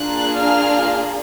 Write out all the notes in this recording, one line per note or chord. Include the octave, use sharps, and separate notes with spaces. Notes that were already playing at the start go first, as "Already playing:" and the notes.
Already playing: A#3 D4 F4 G#4 F#6
F6